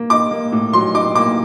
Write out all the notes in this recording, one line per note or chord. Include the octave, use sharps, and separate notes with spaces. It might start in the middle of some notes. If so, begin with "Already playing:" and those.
Already playing: A#3
D#4 D6
A#3
A2
F#3 C6
D#4 D6
A#3 D6